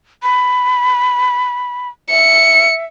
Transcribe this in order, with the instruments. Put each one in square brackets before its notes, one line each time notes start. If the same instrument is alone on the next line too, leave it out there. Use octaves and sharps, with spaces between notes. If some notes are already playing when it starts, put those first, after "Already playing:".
[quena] B5
[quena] E5 [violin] C#7